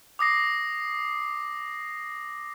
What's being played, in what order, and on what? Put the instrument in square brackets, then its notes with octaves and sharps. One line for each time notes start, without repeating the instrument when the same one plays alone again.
[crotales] D6 D#6 A#6 C7